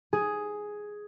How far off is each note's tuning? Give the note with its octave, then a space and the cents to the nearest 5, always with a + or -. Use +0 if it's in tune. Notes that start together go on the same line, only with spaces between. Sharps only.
G#4 +5